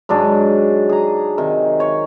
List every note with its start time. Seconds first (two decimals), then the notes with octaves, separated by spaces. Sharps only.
0.09 G#2 F#3 D4 G#4
0.89 G#4 A#5
1.38 C3 D#3
1.80 C#5